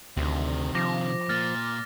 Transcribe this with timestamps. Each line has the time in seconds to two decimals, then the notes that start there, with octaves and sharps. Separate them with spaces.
0.17 D2 C3 D#3
0.75 F3 D6 A#6
1.29 A#2 F6 A6